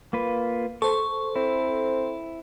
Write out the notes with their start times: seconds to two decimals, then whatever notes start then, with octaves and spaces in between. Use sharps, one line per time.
0.13 A#3 F4 B4
0.82 A4 C5 C#6
1.36 C4 E4